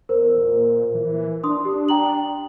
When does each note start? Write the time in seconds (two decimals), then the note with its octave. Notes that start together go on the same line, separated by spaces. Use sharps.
0.09 E2 A#4 C5
0.37 A#2
0.94 E3
1.44 D4 C6 D#6
1.65 G4
1.89 G5 A#5 F#7